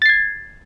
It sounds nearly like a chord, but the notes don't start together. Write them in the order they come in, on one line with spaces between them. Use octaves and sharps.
A6 C7 G#6